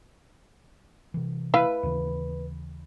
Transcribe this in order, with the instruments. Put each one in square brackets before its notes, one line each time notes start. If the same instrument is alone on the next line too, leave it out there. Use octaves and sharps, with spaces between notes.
[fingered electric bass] C3 E3
[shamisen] E4 E5 F5 [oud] B4
[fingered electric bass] D#2 C#3 E3